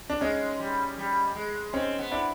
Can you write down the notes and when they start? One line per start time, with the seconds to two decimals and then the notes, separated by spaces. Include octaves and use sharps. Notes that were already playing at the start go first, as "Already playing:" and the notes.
0.10 D4
0.21 G#3 C#4 D#4
0.60 G3
0.98 G3
1.36 G#3
1.73 C4 C#4 D#4
1.99 B3
2.11 D4 E4